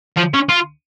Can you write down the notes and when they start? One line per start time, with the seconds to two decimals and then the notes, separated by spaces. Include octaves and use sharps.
0.17 F3
0.34 C#4
0.49 F4